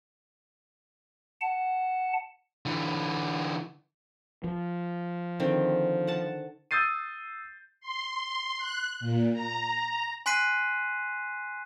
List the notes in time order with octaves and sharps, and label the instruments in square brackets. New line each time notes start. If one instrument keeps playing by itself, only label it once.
[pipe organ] F#5 A5
[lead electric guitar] D3 E3
[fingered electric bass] F3
[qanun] D3 D#3 C4
F#5 A5
[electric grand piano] D#6 E6 G6 A6 C7 D#7
[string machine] C6
F#6
A#2
A#5
[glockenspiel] G#5 C6 F#6 B6 C7 D#7